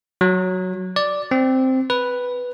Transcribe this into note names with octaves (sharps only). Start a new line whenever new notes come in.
F#3
D5
C4
B4